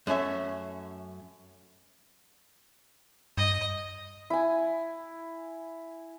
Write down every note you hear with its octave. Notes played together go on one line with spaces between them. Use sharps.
F#2 A3 C#4 E5
G2 D#5
E4 G#5